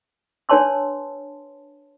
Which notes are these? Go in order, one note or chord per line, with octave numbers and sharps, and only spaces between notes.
D4 B4 C#5 A5 C6 E6